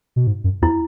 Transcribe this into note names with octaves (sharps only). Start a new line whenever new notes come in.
B2
G#2
F#2
E2 E4